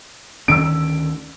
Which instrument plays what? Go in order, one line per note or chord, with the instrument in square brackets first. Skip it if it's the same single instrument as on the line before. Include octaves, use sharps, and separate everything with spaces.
[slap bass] D2 D#3 C#4 [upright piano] E6 D7